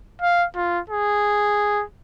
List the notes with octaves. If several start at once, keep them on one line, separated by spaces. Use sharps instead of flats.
F5
F4
G#4